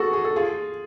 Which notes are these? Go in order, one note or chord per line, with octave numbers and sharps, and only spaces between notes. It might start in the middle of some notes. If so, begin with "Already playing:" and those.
Already playing: F#4 G#4 A4
G#4
A4
F4 G#4